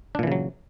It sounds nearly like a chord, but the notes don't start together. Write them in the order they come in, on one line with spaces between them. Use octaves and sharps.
D4 A#2 E3 C#3 F#3